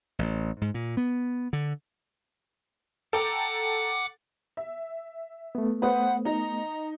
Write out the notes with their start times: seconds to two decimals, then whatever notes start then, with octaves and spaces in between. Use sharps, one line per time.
0.19 A1
0.61 G#2
0.74 A#2
0.97 B3
1.53 D3
3.13 A4 F#5 G5 A#5 D6
4.57 E5
5.55 A3 B3
5.82 B4 C5 F#5 D#6
6.25 D#4 A#5